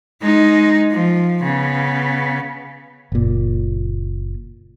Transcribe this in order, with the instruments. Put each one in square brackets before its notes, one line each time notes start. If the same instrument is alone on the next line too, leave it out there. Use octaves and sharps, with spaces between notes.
[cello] G#3 D#4
F3
C#3 B3
[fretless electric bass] F#1 A#2